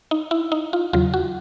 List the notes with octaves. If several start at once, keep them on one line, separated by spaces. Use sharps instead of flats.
D#4
E4
D#4
F4
E2 C#3 F#3 F4
F#4